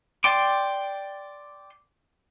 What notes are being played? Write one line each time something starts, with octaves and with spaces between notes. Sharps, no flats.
D5 G5 C6 D6